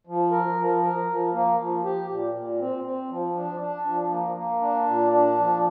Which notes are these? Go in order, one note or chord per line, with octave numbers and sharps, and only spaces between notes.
F3
A#4
F3
A#4
F3
A#3
F3
G4
A#2
A#2
C4
C4
F3
D4
D4
F3
A#3
A#3
D4
A#2
D4
F3